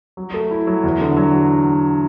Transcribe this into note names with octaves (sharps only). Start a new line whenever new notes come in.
F#3
A3
E4
F#3
E2
D3
F#3